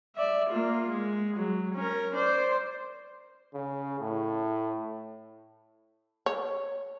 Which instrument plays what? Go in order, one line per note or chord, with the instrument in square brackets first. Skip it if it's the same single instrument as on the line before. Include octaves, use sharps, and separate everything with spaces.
[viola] D5 E5
A#3 F4
G#3
F#3
C#4 A#4
C5 D5
[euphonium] C#3
A2
[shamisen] C#5